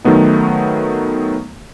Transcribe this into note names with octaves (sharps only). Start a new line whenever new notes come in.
D#3 F#3 A3 B3 D#4